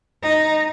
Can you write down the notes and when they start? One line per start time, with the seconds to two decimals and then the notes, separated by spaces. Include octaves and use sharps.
0.23 D#4